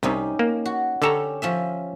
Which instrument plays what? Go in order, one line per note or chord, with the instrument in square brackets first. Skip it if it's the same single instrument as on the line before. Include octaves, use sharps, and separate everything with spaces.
[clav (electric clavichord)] C2 C3 [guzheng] C#4 D#4 G4
[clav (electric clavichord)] A#3
[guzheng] F#4
[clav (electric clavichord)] D3 A4 A#5 [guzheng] C#4 G4 C#5
[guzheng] F3 C#4 E5